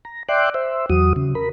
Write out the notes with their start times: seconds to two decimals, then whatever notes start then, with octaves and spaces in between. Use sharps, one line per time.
0.05 A#5
0.29 D5 E5 G5 C6 D6 F#6
0.54 C5 E5
0.90 E2 F#3 F#4 D#6
1.16 C#3
1.35 A#4 B5